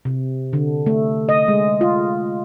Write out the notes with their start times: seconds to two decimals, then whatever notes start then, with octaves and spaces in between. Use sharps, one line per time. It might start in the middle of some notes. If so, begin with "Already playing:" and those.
0.05 C3
0.53 D3
0.87 A3
1.29 D#5
1.48 G#3
1.81 F4